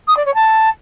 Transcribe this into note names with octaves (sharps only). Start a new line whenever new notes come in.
D#6
D5
C#5
A5